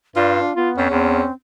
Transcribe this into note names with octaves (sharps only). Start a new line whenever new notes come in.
G2 F4 D5
D4
B3 F4
F2 C#4
E2 C4